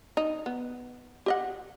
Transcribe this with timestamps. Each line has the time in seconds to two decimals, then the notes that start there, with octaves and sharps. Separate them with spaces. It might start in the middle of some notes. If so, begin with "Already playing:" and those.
0.17 D#4
0.46 B3
1.26 G4 D#5 F#5